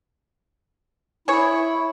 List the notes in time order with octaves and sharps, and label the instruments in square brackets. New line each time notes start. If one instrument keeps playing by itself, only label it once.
[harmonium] E4 [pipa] G#4 C#5